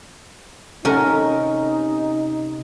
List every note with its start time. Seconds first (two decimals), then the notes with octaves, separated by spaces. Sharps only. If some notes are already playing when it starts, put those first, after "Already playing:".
0.85 C3 C#4 D#4 A4 A#4 F#5